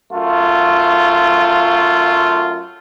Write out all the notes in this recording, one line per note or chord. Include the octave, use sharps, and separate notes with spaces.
F#2 A3 F4